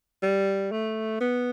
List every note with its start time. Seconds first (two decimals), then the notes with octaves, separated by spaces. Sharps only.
0.22 G3
0.72 A3
1.21 B3